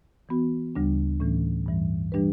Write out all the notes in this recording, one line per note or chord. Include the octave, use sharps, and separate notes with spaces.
E3 B3 F#4
D2 C#3 G3 D4
A2 E3 A3 C#4
G2 E3 G3
E3 G3 D4 G4 B4